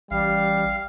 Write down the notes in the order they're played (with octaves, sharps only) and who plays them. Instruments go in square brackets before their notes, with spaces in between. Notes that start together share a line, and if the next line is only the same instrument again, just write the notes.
[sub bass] A1 [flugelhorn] G3 [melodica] F5